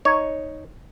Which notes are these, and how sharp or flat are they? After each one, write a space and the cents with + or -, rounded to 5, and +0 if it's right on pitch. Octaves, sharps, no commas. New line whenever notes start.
D#4 +0 C#5 +0